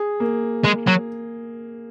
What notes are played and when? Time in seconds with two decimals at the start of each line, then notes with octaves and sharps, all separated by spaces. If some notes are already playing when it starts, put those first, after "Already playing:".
Already playing: G#4
0.20 A#3
0.65 G#3
0.87 F#3